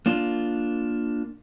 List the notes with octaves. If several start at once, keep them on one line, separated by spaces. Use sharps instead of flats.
A#3 D4 F4